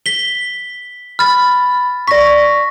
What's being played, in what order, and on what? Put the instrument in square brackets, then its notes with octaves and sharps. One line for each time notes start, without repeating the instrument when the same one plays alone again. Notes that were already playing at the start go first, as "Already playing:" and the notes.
[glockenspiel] B6 G7
[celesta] B5 [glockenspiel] F6 A6
[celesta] D5 C#6 [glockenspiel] A#6 B6